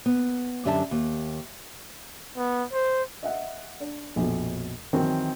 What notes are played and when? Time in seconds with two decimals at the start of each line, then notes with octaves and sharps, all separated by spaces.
0.06 B3
0.65 F#2 D3 G4 D5 E5 A5
0.91 D#2
2.37 B3
2.73 C5
3.23 D#5 E5 F#5
3.80 D4
4.16 A#1 F2 B2
4.93 D#3 E3 F#3 C4